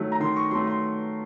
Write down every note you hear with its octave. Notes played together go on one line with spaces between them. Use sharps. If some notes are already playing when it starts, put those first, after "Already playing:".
Already playing: D#3 F#3 A3
A#5
D#3 C6
C#6
F#3 A3 C6
C6